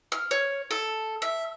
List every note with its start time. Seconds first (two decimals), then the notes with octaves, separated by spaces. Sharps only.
0.12 F6
0.31 C#5
0.71 A4
1.22 E5